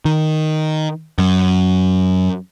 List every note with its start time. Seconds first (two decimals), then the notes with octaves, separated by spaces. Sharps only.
0.05 D#3
1.18 F#2